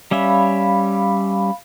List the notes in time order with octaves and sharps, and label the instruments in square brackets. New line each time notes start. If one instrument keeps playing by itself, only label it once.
[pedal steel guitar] G3 C#4 E5 [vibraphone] F5 B5